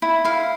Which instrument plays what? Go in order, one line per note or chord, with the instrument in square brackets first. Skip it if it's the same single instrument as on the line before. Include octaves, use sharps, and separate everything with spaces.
[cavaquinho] E4
E4 F5